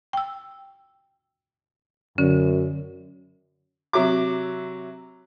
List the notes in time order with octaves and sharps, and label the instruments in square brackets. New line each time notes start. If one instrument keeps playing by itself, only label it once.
[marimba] G5 E6
[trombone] F#2 [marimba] D3 C#4
[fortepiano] C3 F#3 E5 D6